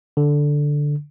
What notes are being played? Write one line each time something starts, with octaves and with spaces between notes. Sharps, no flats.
D3